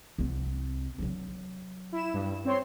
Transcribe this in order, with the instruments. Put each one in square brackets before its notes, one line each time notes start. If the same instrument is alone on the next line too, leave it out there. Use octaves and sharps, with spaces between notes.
[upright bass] C2 C4
F#3 D4
[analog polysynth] E4 E7
G2
C4 C#5 C6